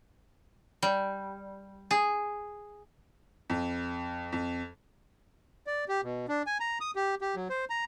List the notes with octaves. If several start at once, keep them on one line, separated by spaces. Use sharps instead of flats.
G3
G#4
F2
F2
D5
G4
B2
D4
G#5
A#5
D#6
G4
G4
F#3
C5
A#5